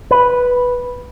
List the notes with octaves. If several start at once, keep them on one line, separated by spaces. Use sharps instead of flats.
B4